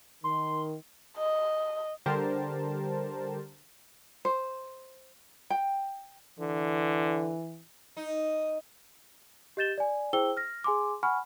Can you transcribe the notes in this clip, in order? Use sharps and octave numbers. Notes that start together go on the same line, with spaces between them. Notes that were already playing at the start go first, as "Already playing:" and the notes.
D#3 C6
D#5
D3 G3 G4 A#4 C5 A5
C5
G5
D3 E3
D#4
G4 D#5 G6 A6 E7 G7
D5 G#5
E4 G#4 C5 G5 E6 G7
F6 A#6
G#4 G#5 C6 D6
F#5 G#5 B5 C#6 F6